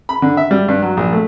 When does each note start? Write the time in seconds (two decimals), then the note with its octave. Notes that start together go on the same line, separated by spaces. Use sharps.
0.09 B5
0.22 D3
0.37 E5
0.51 G3
0.68 G2
0.82 F#3
0.97 A#1
1.13 A3